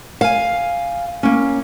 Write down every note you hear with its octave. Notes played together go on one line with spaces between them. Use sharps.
F5 G#5
A#3 C#4